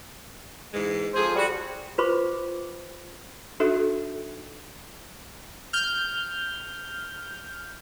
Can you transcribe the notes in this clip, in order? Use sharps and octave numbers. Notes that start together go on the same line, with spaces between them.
G#2 E3 G#3
F2 G#4 C5
G3 F#4
F4 B4 C5 B5 C#6 D6
D4 D#4 F#4 A4 E5
F6 G6